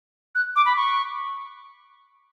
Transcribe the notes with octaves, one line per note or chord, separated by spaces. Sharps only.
F#6
D6
B5
C#6